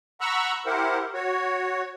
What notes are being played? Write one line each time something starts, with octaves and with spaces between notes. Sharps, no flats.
F#5 A#5 B5 C#6 E6 F#6
E4 G4 A#4 C5 F#5
F#4 C#5